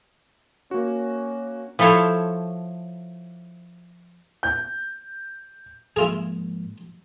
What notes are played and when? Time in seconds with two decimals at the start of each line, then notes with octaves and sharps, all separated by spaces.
0.71 A#3 C#4 F#4
1.79 F3 E4 A4 C5 C#5
4.43 G6
5.96 G#2 F3 A#3 E4 F4 G#4